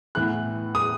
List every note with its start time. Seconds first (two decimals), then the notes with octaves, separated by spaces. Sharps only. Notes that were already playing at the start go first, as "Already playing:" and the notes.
0.15 A2 E3 B3 F#6
0.75 D#6